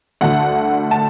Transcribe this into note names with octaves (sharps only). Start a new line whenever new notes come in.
D2 D3 A3 F#5
A5